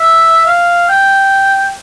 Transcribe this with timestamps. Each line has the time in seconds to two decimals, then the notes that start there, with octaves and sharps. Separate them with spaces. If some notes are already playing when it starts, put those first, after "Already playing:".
Already playing: E5
0.46 F5
0.89 G5